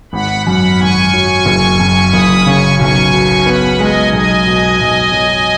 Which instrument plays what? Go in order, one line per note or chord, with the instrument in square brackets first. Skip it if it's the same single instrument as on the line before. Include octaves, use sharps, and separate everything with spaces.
[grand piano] G#1 [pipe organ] F#5 B5
[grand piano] F#2 [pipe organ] F#5 B5
[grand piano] G#1 [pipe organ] G#5 C#6
[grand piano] F#3
F#1
F#2
[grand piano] F#1 [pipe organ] B5 D#6
[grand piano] C#3 [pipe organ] G#5 C#6
[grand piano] B1 [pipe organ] G#5 C#6
[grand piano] B2
[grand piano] B3 [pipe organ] F#5 B5
[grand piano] G#3 [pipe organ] D#5 G#5
[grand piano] B1 [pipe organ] D#5 G#5
[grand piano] B2
B1
F#3